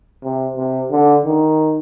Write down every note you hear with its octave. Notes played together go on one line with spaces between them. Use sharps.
C3
C3
D3
D#3